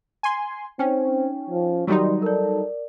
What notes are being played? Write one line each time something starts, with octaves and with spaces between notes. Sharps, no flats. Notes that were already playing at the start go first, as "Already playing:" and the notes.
G#5 C6
C4 C#4 D#4 G5
F3
D#3 F#3 G3 D#4 F#4 D5 C6
A4 A#4 D5